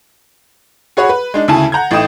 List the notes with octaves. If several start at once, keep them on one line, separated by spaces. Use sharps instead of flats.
F#4 G#4 C#5 F#5 B5
B4
G#3 D4 D#4
D2 C#3 E4 G#5 A5
F#5 A#5 G6 G#6
A1 A2 D#4 G5 D#6 E7